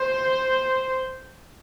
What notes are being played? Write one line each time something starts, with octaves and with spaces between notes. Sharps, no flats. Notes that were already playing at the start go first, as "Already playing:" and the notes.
Already playing: C5